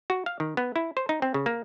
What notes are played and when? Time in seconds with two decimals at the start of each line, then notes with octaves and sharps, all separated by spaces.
0.10 F#4
0.26 F5
0.40 D#3
0.57 B3
0.76 E4
0.97 C5
1.09 D#4
1.22 C4
1.34 C#3
1.46 A#3